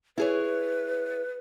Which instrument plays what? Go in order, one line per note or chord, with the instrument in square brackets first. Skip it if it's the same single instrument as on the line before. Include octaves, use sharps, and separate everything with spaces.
[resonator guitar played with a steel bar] E4 G#4 C#5 [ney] B4